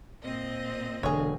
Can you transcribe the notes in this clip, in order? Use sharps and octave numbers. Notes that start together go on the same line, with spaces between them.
A#2 C4 D#5
E1 D3 G#4 C#5